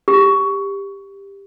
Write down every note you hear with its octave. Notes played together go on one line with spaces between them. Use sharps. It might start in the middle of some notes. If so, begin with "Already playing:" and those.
G4